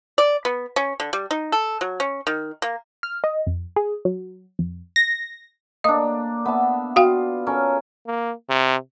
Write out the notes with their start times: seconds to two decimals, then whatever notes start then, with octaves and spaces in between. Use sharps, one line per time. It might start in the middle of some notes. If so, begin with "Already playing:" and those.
0.18 D5
0.45 B3
0.76 C#4
1.00 D3
1.13 G3
1.31 D#4
1.52 A4
1.81 F#3
2.00 C#4
2.27 D#3
2.62 A#3
3.03 F6
3.24 D#5
3.47 F2
3.76 G#4
4.05 F#3
4.59 F2
4.96 A#6
5.84 A#3 D4 D#5 D#6
6.45 B3 E5 A5
6.96 F4 F#4 F5 G5
7.46 C#4 A4 A#4
8.07 A#3
8.50 C3